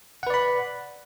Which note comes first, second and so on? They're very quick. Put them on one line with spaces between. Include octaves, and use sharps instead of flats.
F#5 B4 D5 B5